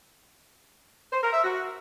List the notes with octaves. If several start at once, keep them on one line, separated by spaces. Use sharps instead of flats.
C5
A#4
E5
F#4